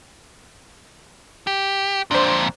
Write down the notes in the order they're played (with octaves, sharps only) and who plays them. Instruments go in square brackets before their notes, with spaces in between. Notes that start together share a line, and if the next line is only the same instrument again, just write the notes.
[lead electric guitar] G4
[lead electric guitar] F2 A#2 [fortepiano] D4 C5